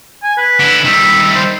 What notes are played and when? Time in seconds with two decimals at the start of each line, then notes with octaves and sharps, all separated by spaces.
0.24 G#5
0.37 B4
0.60 D3 E4
0.85 D#3 G3 E5
1.35 C5